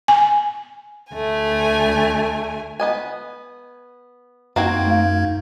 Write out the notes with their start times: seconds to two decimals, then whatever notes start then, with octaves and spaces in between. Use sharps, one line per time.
0.08 G#5
1.12 D2 A3 G#5
2.80 B3 D#5 G#5
4.56 F#2 A#3 C4 D#4 F#4 G#6
4.86 A3 F5